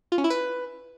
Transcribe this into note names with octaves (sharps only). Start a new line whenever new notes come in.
F4
C#4
E4
B4